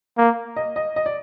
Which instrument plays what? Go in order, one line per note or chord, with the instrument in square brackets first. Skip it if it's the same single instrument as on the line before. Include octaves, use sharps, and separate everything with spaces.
[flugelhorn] A#3
[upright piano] D#5
D#5
D#5
D5